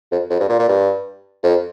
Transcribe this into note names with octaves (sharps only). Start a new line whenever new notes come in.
F2
F2
G2
A#2
A#2
G2
F2